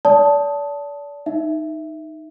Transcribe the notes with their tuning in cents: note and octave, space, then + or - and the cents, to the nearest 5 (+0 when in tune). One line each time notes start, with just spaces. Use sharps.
D5 -35 A5 +0 D#6 +15
D#4 +0 E5 +5